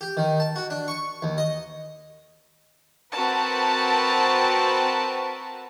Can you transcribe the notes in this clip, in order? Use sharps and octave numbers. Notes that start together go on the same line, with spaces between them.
G4
D#3
A5
F#4
D4
C#6
D#2
D#5
C4 F#4 A#4 B4 A5